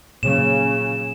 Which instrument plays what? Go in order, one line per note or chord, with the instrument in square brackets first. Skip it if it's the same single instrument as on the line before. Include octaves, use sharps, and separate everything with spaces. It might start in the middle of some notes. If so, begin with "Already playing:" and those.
[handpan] A#2 F#3 [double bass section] C#3 [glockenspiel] E7